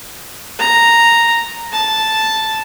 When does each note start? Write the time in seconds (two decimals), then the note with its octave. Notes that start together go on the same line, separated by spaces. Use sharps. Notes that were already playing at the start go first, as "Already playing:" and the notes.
0.59 A#5
1.72 A5